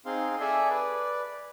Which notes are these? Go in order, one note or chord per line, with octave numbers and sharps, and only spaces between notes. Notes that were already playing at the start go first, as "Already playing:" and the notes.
C4 D#4 G#4 F5 C6
G#4 A4 D5 E5 G#5
B4 D5